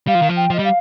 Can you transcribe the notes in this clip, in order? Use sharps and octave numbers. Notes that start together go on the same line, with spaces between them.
G3 F5
F3
D#3
F3
G5
F3 D#5
G3
F5